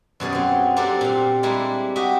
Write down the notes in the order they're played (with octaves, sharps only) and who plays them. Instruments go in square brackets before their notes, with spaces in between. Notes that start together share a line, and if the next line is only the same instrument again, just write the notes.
[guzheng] F#2 B2 G#4 D5
F#3 C4
A#3 C4 D4 G4 A4
A#2 F5
G3 G#3 A#3 D4 E4
F#4 G4 D#5 E5